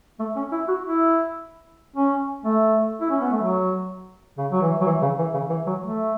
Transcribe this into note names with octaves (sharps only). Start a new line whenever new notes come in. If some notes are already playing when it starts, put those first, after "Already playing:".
A3
C#4
E4
F#4
E4
C#4
A3
E4
C#4
B3
A3
F#3
C#3
F#3
E3
F#3
E3
C#3
E3
C#3
E3
F#3
A3